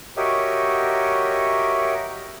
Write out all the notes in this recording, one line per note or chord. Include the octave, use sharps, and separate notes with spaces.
F#4 G4 A#4 C#5 D#5 E5